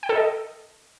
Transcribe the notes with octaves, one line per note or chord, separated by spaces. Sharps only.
G5
A4
D#5